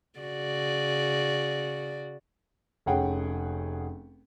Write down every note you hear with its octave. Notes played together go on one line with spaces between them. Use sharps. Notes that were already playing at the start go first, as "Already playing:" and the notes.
C#3 F#4 D5
F1 C#4 G#4 F#5 G5